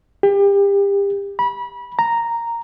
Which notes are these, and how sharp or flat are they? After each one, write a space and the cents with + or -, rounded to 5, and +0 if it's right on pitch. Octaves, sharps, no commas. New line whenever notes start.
G4 +30
B5 -25
A#5 -5